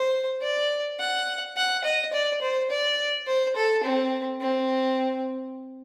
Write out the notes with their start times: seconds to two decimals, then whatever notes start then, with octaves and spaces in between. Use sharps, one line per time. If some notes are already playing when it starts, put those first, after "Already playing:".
Already playing: C5
0.42 D5
1.00 F#5
1.57 F#5
1.84 D#5
2.13 D5
2.42 C5
2.70 D5
3.27 C5
3.56 A4
3.83 C4
4.41 C4